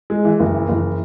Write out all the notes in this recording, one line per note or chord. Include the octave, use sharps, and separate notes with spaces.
G#3
E3
F#1
E3
F#1